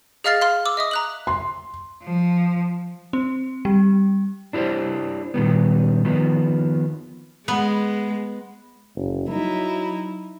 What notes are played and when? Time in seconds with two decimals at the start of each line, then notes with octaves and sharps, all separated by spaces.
0.24 G#4 D#5 F5 F6 A6 C7
0.41 F5 C6 F6
0.66 D6 E6
0.77 D#5 E5 D#6
0.91 A#5 F#6 F#7
1.27 C6
2.02 F3
3.13 C4
3.65 G3
4.53 D4 E4 G4 A4 C5
5.34 A#2 D#3 G3 B3
6.05 D#3 F3 B3
7.48 G#3 B3
8.96 F#1
9.29 F#3 D#4 E4